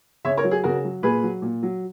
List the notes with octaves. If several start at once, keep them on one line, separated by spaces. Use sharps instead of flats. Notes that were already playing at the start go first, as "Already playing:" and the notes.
C#3 C#5 E5
A#4 C#5
F#3
G#4
C#3 F#4 A#4
F#3
A#2 G#4 B4
F#3
A#2
F#3